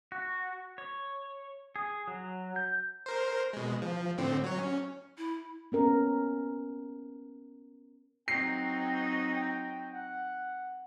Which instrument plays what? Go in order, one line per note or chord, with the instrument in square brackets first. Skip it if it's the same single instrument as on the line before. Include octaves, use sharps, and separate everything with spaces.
[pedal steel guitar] F#4
C#5
G#4
F#3
G6
[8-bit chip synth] A#4 C5
B2 G#3
F3
A2 D3 C4
F#3 C#5
C#4
[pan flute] E4
[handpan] B3 C#4 A#4
[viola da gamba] F#3 C4 D#4 [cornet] G5 [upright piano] C7
[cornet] G5
F#5